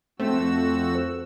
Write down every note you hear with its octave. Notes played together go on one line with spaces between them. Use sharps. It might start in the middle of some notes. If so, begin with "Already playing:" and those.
F2 A3 C4 F#4 A4 C5 E6